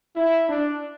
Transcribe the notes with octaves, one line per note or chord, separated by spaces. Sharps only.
E4
D4